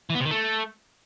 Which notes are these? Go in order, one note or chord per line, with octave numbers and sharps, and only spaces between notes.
E3
B3
C3
D#3
A3